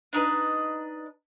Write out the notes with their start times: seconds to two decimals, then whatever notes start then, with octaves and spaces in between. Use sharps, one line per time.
0.13 D4 D#4 B4